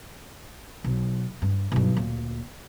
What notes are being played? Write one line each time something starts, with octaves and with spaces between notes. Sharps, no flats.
B1
G2
B1 G2
D2 A#2